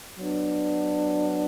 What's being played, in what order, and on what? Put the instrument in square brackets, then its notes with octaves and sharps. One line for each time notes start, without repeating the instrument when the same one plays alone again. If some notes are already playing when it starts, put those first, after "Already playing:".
[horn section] F#3 B3 D4